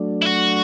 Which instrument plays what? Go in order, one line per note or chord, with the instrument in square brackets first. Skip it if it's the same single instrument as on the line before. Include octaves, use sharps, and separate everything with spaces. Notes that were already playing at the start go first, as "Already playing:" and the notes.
Already playing: [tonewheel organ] F#3 A3 D4
[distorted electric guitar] E4
F#4